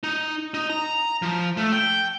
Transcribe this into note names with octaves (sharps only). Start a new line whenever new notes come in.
D#4
D#4
A#5
F3
A3
G5